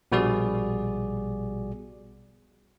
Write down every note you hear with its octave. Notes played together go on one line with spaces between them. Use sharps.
A#1 B2 G3 F#4 G#4 D5